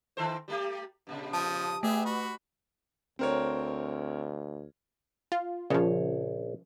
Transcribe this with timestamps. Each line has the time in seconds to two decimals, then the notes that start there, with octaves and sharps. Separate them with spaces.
0.17 D#3 A4 C5
0.48 G3 A3 G4
1.07 G2 A#2 C#3
1.33 F3 A5 D#6
1.83 A3 B3 G4 G#4 E5
2.05 F#4 B5
3.19 D2 C4 A#4 C#5
5.32 F4
5.70 A#1 C#3 F3 C#5